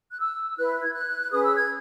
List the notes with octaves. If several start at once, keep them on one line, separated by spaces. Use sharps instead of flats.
F#6
E6
E4 B4 F#6
G#6
F#6
C#4 G#4 B4 D#6
E6
G#6